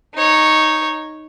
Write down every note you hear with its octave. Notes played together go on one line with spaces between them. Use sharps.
D#4 C#5